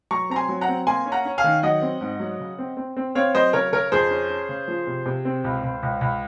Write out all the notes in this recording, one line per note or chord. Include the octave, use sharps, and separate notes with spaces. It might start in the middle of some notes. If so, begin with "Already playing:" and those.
F#3 A#5 C#6
C4 A#5
G#5 C6
F#3
F#5 A#5
C4
A#3 G#5 C6
C#4
F#5 A#5
C#4
F5 G#5
D#3
F#3 D#5 F#5
C4
G#2
F#3
C#3
C4
C4
C4
C4 C#5 F5
F#3 C5 D#5
C#3 A#4 C#5
C#3 A#4 C#5
F2 G#4 C5
C#4
C#4
C#3
F3
C3
C3
C4
C#2
C#2
C#2
C#2